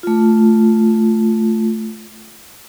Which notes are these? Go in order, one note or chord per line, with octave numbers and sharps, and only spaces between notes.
A3 F4